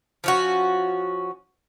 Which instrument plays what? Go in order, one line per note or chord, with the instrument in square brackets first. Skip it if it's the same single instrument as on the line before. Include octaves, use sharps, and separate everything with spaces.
[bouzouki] F3 C#4 F#4